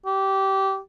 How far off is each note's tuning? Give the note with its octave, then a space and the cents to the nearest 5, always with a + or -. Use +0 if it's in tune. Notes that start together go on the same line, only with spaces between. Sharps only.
G4 -20